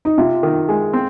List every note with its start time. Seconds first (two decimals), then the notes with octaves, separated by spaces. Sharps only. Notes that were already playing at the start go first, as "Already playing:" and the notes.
0.05 D#4
0.18 C3 F4
0.43 D#3
0.69 G#3
0.93 C4